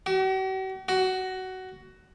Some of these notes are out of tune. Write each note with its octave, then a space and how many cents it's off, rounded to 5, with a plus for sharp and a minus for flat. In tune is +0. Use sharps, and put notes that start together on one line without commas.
F#4 +45
F#4 +15